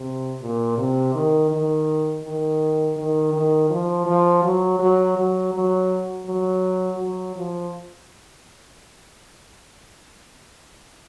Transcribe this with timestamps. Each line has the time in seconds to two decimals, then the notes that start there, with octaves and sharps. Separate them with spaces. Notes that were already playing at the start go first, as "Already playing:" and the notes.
Already playing: C3
0.41 A#2
0.78 C3
1.15 D#3
1.51 D#3
2.24 D#3
2.97 D#3
3.33 D#3
3.70 F3
4.06 F3
4.43 F#3
4.79 F#3
5.17 F#3
5.54 F#3
6.27 F#3
6.99 F#3
7.36 F3